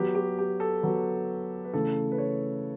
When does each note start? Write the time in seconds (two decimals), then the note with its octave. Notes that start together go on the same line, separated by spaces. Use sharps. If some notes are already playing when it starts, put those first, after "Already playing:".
Already playing: F#3 B3 F#4 G4
0.15 G4
0.39 G4
0.60 A4
0.83 F#3 B3 F#4
1.65 B4
1.73 C#3 E3 A3 A4
2.12 B4
2.18 C#5